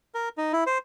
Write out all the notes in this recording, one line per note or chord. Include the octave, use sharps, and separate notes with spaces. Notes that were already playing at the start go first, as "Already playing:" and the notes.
A#4
D#4
E4
C5